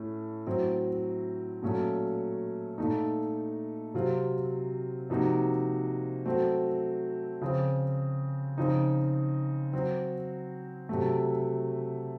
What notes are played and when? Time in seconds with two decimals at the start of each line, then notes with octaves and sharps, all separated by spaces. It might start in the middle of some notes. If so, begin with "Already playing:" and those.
Already playing: A2 A3 C#4
0.47 A2 F#3 C4
1.62 A#2 F#3 A3 C#4
2.78 A#2 A3 D#4
3.94 C3 F#3 C4 F4
5.10 C3 F3 A#3 D#4 F#4
6.26 F#3 A3 C4 F#4
7.42 C#3 F3 C4
8.58 C#3 F3 C4 D#4
9.73 F#3 C4 F#4
10.89 C3 F#3 A3